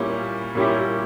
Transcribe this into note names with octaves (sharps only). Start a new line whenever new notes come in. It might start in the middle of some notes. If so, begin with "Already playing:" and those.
Already playing: A#2 G3 C#4 E4 G4
A#2 G3 C#4 E4 G4